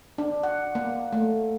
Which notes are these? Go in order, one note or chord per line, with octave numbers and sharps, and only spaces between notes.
D4
F#5
A#3
A3